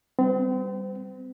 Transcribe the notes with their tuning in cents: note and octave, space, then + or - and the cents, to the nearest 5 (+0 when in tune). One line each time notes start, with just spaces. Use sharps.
G3 +0 C4 -40